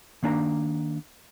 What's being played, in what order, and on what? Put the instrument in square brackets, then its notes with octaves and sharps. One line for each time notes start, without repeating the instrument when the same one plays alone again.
[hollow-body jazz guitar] D#3 A#3 D4 G#5 A#5